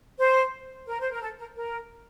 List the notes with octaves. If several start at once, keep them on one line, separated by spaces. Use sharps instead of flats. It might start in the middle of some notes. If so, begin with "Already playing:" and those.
C5
A#4
C5
A#4
A4
A#4
A#4